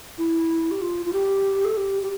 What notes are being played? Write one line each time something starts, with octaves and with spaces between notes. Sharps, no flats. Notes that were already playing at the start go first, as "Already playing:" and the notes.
E4
G4
F4
F4
G4
A4
G4
G4